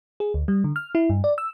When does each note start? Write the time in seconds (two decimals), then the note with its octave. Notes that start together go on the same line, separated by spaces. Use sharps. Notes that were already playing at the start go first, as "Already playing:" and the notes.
0.20 G#4
0.34 D2
0.48 G3
0.64 D3
0.76 F6
0.95 E4
1.10 G2
1.24 D5
1.38 E6